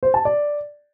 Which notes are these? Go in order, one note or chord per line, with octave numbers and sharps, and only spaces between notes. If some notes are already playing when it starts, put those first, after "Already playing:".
C5
A5
D5